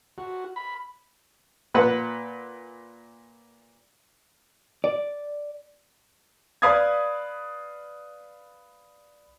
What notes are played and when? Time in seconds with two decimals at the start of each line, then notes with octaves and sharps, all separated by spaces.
0.18 F#4
0.56 B5
1.74 A#2 B4 F#5
4.84 D5
6.62 B4 D5 F5 B5 D#6 G#6